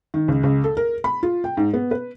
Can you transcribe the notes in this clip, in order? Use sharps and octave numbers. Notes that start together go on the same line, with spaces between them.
D#3
C#2
C#2
A4
A#4
B5
F4
G5
G#2
B3
B4